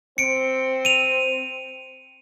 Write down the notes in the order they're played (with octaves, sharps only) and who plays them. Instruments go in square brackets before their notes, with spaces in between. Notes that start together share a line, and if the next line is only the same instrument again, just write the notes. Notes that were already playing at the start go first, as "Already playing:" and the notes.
[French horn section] C4 C5 [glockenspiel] C#7 D7
[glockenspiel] D#7 F7